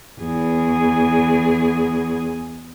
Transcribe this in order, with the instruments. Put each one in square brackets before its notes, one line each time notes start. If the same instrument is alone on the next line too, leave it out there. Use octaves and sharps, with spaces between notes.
[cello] E2 G#4